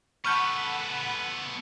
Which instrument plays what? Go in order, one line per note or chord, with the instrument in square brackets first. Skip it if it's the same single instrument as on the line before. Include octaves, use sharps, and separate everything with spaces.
[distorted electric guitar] B3 A4 [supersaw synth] F#5 B5 [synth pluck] C#6 F6 G6